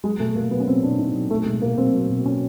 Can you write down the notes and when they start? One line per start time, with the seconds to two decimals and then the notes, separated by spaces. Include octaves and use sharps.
0.04 F#3 G#3
0.20 B2 A3
0.36 B2 A#3
0.51 F#3 B3
0.60 C#4
0.67 F#3 C4
0.83 B2 D4
0.99 B2 D#4
1.15 F#3
1.30 F#3 A3
1.46 B2 G#3
1.62 B2 A#3
1.78 F#3 C4
1.94 F#3
2.10 B2
2.25 B2 C#4